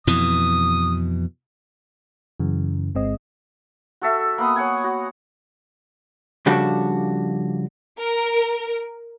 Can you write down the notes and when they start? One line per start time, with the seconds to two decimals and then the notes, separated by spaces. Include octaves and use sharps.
0.07 F2 B2 E3 D#6
2.40 F#2 C#3 E3
2.95 G1 G#3 C4 D#5
4.02 F#4 A4 E5
4.38 A#3 B3 D#6
4.56 C#5 F#5 G#5
4.84 F#4
6.46 C#3 F3 G3 D4 F#4 A4
7.99 A#4